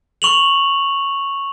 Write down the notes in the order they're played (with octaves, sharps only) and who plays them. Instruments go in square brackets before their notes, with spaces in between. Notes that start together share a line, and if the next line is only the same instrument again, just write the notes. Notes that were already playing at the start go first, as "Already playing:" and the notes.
[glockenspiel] C#6 F7 F#7